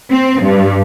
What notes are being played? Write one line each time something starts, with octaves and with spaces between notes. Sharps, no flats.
C4
G2